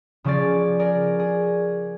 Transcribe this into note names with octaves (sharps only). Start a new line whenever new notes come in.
C#3 F3 C#4 G#4 D5 A6
G#4 A#4 D5
G#4